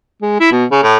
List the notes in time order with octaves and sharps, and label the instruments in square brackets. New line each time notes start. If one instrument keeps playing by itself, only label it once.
[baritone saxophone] G#3
E4
B2
C#3
A2